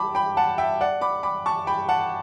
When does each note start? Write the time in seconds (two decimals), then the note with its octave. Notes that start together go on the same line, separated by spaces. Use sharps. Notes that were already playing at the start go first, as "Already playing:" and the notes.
Already playing: G5 A5 B5 D6
0.15 G5 B5
0.37 F#5 A5
0.58 E5 G5
0.81 D5 F#5
1.01 B5 D6
1.23 B5 D6
1.46 A5 C#6
1.67 G5 B5
1.89 F#5 A5